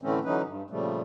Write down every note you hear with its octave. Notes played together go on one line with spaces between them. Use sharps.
A2 D3 E3 A3 C4 C#4
D3 E3 F#3 C#4 D#4 B4
G2
A#2 C#3 F3 G3 A3